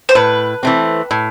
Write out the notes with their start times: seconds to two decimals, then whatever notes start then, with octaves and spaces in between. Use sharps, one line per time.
0.09 C5
0.15 A2 B4
0.63 E3 A3 C4
1.11 A2